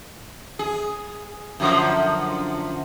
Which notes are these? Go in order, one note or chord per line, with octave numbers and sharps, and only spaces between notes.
G#4
F#2 D3 F3